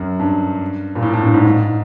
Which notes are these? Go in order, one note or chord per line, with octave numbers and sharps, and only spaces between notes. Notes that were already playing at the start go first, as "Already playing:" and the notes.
Already playing: F#2
G2
A#2
A2
A2
G2
G#2
G#2